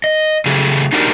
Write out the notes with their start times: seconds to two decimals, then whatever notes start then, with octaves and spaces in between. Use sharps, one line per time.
0.04 D#5
0.45 C#3 F#3 A3 G4 G#4
0.92 D4 D#4 F#4 G4 A#4